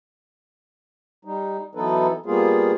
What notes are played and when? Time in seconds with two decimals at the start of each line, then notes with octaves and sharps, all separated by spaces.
1.25 G3 D#4
1.75 E3 F#3 B3 D#4 A4 B4
2.26 G3 A#3 B3 F4 G#4